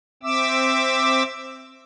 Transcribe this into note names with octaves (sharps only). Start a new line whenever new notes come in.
C4 E5 D6 E6